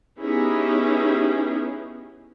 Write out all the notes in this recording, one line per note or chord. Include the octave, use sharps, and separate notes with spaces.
B3 C#4 D#4 E4 G4 G#4